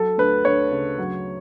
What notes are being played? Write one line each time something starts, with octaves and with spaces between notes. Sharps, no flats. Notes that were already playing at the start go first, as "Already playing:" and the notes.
Already playing: F#3 A4
D2 B4
D2 C#5
C#3
F#3